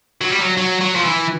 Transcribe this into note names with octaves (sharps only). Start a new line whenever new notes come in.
F#3
G3
F#3
F#3
F#3
F3
E3